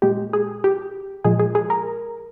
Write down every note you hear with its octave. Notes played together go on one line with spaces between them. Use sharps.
A#2 G#3 G4
G#4
G4
A#2 F3 G#3 G#4
G#4
G#4
A#4